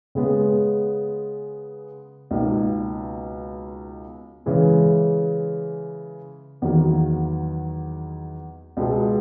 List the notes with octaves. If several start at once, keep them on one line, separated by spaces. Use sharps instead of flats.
C#3 G#3 B3
C#2 B2 A#3 D#4
C#3 E3 G#3
E2 D#3 F#3 A#3
C#2 B2 G#3